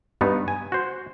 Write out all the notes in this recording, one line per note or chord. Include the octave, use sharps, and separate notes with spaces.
G2 B3 D#4
G#5
F#4 C5